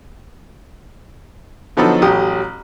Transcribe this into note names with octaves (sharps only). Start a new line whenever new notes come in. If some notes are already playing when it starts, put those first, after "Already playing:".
D3 F3 F#3 B3 D#4 A4
A1 F#3 G4 D#6